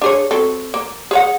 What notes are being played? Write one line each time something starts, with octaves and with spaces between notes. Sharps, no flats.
D4 G#4 C#5
F#3 C4 A4
A#3
G#4 C#5 F#5